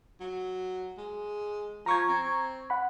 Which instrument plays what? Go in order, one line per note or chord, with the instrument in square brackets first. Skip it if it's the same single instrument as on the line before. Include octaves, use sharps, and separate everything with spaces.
[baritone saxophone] F#3
G#3
[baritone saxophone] F3 [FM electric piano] A#5 C#6 G#6
[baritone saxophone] C4
[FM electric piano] F#5 B5